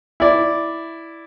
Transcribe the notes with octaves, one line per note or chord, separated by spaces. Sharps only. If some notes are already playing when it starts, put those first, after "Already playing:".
E4 D5